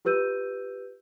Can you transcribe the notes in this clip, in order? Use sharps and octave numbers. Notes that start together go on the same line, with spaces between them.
F4 G4 B4 E6 G6 D#7